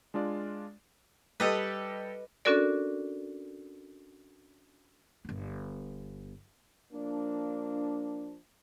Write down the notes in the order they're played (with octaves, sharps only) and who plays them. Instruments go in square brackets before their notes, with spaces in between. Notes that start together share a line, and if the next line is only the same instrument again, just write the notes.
[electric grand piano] G#3 D4 F4 D5
[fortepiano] G3 G4 A4 [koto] B4 D#5
[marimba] C#4 D4 F#4 A4 A#4 D5
[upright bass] G1 B3
[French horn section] F3 A#3 D4